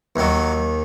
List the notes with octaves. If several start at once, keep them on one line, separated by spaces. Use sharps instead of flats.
D#2 D#3 F#3